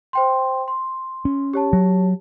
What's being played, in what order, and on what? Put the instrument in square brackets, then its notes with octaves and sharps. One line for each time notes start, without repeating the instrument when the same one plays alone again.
[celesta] C5 G5 C6
C6
[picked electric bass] C#4
[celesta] G4 C#5 A5
[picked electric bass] F#3